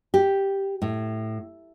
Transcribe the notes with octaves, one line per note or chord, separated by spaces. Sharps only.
G4
A2